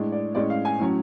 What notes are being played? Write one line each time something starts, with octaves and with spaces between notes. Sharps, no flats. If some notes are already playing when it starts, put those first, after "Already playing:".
Already playing: A2 G#3 D4
D5
A2 G#3 C#4 D5
F5
G#5
A2 F#3 C#4